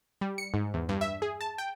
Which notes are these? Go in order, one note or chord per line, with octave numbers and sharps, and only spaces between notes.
G3
C#7
G#2
E2
G2
E5
G#4
A5
G5